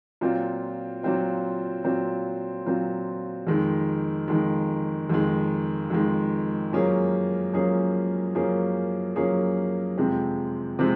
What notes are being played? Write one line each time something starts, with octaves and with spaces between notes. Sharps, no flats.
A#2 F#3 C4 F4
A#2 F#3 C4 F4
A#2 F#3 C4 F4
A#2 F#3 C4 F4
F2 D#3 G#3
F2 D#3 G#3
F2 D#3 G#3
F2 D#3 G#3
F#2 F3 A#3 C#4 G#4
F#2 F3 A#3 C#4 G#4
F#2 F3 A#3 C#4 G#4
F#2 F3 A#3 C#4 G#4
F2 C3 F3 G#3 C4
C3 F3 G#3 C4